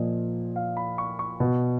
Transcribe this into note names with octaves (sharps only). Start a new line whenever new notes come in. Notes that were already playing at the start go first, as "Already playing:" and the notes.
Already playing: A#2 F3 D#5
F5
B5
C#6
C#6
B2